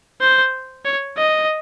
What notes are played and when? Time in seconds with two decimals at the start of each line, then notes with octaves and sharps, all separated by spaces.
0.21 C5
0.85 C#5
1.18 D#5